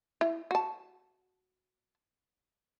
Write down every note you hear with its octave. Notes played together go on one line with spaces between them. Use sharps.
E4
F#4 A5